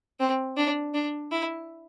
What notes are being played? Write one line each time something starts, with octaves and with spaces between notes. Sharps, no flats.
C4
D4
D4
E4